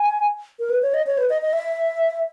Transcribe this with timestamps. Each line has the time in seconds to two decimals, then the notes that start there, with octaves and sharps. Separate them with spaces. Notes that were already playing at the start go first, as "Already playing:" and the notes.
Already playing: G#5
0.59 A#4
0.70 B4
0.82 C#5
0.94 D#5
1.07 C#5
1.18 B4
1.30 D#5
1.42 D#5
1.53 E5